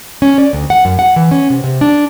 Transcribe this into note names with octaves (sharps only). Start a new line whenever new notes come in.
C#4
D5
D2
F#5
F#2
F#5
E3
C#4
C3
C3
D4